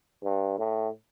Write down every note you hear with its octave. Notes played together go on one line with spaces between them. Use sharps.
G2
A2